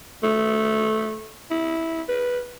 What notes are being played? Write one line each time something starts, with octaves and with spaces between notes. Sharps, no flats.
A3
E4
B4